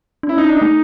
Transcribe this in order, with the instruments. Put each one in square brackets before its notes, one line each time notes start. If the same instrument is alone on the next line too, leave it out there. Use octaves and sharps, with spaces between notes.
[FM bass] D4
[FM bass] C#4 [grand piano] E4
[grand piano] D#4
D4
D#4
[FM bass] A3